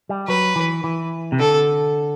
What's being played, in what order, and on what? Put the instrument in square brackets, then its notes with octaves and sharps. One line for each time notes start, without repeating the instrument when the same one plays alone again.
[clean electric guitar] G3
[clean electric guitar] F#3 [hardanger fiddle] B4
[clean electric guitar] E3
E3
C3
[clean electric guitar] D3 [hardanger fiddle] A4